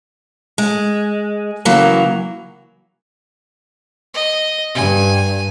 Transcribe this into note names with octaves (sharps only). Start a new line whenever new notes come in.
G#3
C#3 E3 F#3 A#3
D#5
G2 G#5